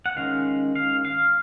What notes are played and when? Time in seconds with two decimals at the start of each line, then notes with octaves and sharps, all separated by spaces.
0.06 F#5
0.16 D#3 G#3 C#4 F5
0.75 F5
1.05 F5